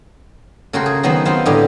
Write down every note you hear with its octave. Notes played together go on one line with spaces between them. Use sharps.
C#3 A3 F#4 A#4 G5 C6
G#4
D#3 F#3 B3 C5 C6
B3 C4 D#4 F4 C5
A2 D3 G3 C#4 G4 D#5